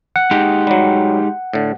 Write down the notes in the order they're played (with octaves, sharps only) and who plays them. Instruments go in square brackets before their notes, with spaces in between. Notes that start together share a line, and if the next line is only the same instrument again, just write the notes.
[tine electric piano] F#5
[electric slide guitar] G#3 D#4 G4
[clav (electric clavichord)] F#3 G3
A2 D3